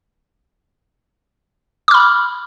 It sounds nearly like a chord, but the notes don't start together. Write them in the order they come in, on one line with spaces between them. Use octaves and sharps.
D6 F6 B5